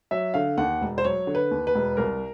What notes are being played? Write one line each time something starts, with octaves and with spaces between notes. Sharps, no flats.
F#3 E5
D3 F5
D#2 F#5
E1
C5
F#3 C#5
D3
B4
D#2
B4
E1
C2 A#4